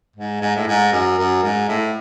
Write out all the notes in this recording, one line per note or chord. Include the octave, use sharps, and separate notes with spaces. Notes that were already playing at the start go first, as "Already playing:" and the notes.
G#2
G#2
A2
G#2
F#2
F#2
G#2
A2